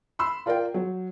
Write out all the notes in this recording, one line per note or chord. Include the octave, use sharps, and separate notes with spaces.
B5 C6 E6
F4 A#4 D5 F5 G5
F#3